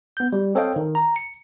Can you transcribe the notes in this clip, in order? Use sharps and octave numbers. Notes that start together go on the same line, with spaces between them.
B3 G6
G3
C4 A4 C#5 D#5 F5 G5
D#3
A#5
C#7